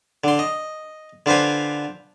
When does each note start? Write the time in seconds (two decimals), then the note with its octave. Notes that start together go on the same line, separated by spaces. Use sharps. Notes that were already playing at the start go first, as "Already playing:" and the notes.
0.24 D3 C6
0.39 D#5
1.26 D3 F4 B4 C5 G#5